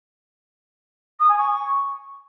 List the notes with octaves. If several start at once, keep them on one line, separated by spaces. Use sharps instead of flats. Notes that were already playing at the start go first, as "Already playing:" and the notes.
D#6
G#5
C#6